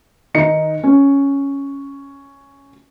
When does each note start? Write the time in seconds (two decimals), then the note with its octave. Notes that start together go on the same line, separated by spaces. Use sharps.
0.34 D#3 D#4 C#7
0.84 C#4